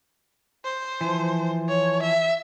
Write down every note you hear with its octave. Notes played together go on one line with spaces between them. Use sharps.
C5
E3 F3
C#5
E5